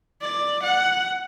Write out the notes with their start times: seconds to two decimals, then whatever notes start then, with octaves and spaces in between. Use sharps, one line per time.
0.21 D5
0.63 F#5